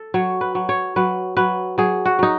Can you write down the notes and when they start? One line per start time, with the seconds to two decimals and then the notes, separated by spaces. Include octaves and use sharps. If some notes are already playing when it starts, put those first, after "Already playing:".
Already playing: A4
0.14 F#3 C#5
0.41 B4
0.55 F#3
0.69 C#5
0.96 F#3 B4
1.37 F#3 B4
1.78 F#3 G#4
2.05 F#4
2.19 F#3 D#4